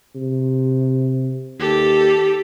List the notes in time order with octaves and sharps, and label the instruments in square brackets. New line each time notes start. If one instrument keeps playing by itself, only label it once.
[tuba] C3
[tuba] D#2 [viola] G4 A4